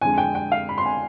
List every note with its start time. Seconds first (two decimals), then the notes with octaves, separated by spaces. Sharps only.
0.01 F2 D3 G#3 G#5
0.18 G5
0.35 G5
0.52 F5
0.69 B5
0.78 C6
0.86 G#5